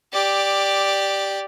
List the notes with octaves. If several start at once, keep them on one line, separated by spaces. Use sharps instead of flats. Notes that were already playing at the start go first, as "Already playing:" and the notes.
G4 D5